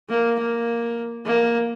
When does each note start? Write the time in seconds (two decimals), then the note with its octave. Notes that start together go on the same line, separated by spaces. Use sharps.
0.09 A#3
0.39 A#3
1.26 A#3